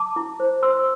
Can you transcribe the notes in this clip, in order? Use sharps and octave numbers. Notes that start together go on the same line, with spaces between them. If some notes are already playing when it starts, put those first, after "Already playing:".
Already playing: A5 D6
E4
C5
C5 C6 E6